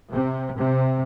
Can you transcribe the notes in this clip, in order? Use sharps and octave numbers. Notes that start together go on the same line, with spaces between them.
C3
C3